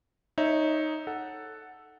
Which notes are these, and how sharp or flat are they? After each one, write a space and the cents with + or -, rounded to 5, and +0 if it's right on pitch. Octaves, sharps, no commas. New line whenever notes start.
D#4 +0 C#5 -15 E5 -10
A4 +0 F#5 +0